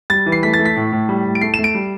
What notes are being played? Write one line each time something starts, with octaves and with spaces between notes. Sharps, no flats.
G3 A6
E3
C7
A3 B6
A6
A3
B6
A2
A2
G3
A2
D7
A3 C7
A3 E7
D7
G3